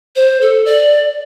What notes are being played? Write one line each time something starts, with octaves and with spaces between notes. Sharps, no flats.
C5
A4
D5